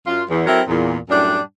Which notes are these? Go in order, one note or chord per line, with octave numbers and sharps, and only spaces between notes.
F#2 F4
E2
F#3 C4 E4 A4 A#4
E2 A#2
F#2 A2 G3 D4